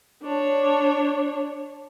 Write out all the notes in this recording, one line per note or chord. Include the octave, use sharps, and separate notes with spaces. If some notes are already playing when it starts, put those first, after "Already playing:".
D4 C#5